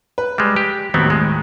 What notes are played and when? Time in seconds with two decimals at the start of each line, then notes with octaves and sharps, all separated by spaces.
0.18 B4
0.38 G3 G#3
0.56 G4
0.94 D#2 A2 F#3 B3 C4
1.10 G#3